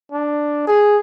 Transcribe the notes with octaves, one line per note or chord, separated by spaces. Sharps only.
D4
G#4